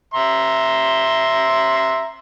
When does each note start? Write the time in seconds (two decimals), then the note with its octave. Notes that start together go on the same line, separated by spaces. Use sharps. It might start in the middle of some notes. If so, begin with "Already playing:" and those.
0.14 E5 A#5 C6